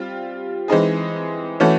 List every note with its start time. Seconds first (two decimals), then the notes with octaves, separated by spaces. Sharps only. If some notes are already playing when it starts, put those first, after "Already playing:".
Already playing: G3 C4 F4
0.68 E3 G#3 C4 D#4 G#4
1.60 E3 A3 C#4 F#4